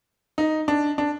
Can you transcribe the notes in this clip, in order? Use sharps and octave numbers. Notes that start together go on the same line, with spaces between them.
D#4
D4
D4